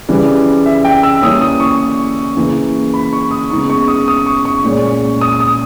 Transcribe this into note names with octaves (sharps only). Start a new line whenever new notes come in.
C#3 E3 G3
E5
G5
E6
E3 G3 A#3 C#4 D#6
D#6
C#6
C#3 E3 A#3
B5
C#6
D#6
C#3 G#3 B3 D#4 C#6
C#6
D#6
D#6
C#6
C#6
A#2 G#3 C#4
D#6
D#6